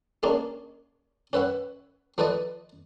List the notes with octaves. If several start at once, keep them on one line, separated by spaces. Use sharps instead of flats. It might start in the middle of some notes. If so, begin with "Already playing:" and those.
G#3 A#3 C#4 D4
C#4 B4 E5 F#5
F3 A3 B4 D5 D#5